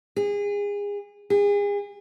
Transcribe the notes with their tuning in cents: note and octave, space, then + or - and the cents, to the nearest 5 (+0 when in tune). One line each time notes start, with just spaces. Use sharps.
G#4 -30
G#4 -35